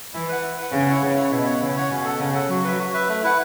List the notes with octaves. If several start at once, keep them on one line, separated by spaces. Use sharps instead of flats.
E3 E4
B4 F#5
E4
B4 F#5
C#3 B3
E4 C#5 F#5
C#3 B3
E4 C#5 F#5
B2 E4
C#5 F#5
C#3 E4
C#5 F#5
B2 C#4
A4 F#5
C#3 C#4
A4 F#5
F#3 F#4
B4 E5
F#4
B4 E5
A3
E4 B4 F#5